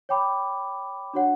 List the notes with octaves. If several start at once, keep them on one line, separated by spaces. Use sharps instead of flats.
C#5 G5 B5 D6
D4 F#4 C#5 F#5